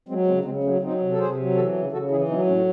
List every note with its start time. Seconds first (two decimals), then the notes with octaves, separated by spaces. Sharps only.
0.09 F#3 G#3 C4
0.26 C#3 G#3 C4
0.45 C#3 G#3 C4
0.63 F#3 A3 C#4
0.81 F#3 C4 D#4
1.00 C3
1.12 A4
1.18 C3 G#4 C5
1.37 F#3
1.55 E3 F#4 A4
1.73 C#3
1.92 C#3 F#4 A4
2.10 E3 E4 G#4
2.28 F#3 C4 D#4
2.47 A2 A3 C#4